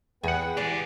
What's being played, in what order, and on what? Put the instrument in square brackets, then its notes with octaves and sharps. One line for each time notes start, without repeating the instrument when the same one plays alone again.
[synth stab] E2 F#5 [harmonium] B3 B4 G5 [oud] G#4
[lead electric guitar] C2 G#3 [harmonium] E3 [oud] G4 D5